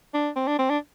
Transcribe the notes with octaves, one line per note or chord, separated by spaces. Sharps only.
D4
C4
D4
C4
D4